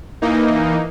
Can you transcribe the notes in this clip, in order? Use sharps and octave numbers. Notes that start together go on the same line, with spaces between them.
E3 A#3 D#4